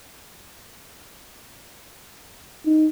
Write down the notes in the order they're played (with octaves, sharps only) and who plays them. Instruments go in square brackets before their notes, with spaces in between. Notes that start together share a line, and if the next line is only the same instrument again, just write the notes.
[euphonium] D#4